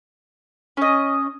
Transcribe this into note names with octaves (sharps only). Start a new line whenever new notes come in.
C#4 D#5